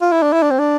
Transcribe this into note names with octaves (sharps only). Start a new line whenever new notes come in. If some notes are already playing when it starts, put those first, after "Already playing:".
F4
E4
D4
E4
D4
C4
D4